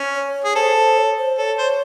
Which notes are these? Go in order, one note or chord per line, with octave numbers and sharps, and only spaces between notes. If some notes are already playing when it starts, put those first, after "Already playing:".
Already playing: C#4
C#5
G#4
A4 C5
C5
C#5
C5
A4 C#5
C5